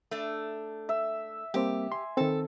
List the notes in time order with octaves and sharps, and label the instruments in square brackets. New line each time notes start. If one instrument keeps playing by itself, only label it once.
[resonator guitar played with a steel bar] A3 D4
[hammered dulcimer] E5
[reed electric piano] G3 A#3 C4 [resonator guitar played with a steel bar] G4
[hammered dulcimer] G#5 [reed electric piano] C6
[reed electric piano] D#3 C4 [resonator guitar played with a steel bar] A4